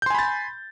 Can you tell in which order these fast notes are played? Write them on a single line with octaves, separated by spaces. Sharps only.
G6 C6 G#5 B5 A6